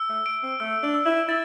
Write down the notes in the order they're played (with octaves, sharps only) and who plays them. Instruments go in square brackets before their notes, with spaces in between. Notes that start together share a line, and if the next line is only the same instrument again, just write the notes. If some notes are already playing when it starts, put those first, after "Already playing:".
Already playing: [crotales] E6
[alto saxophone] A3
[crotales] D7
[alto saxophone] C4
[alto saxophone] A3 [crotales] E6
[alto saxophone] D4
[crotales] E6
[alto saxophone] E4
[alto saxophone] E4 [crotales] A6